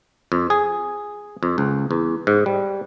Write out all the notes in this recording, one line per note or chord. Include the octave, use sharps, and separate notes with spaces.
F2
G#4
F2
C#2
E2
G#2
G3